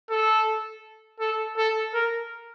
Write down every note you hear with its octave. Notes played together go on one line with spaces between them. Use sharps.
A4
A4
A4
A#4